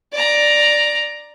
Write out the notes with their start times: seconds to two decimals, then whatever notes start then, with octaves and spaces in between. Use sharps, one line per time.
0.13 D5 A#5